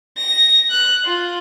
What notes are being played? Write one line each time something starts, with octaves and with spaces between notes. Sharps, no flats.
A#6
F#6
F4